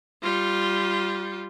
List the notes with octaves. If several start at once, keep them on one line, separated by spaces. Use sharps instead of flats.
G3 F4